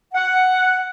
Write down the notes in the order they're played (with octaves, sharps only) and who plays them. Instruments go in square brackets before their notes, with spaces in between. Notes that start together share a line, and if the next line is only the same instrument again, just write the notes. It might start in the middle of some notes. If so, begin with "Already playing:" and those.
[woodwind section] F#5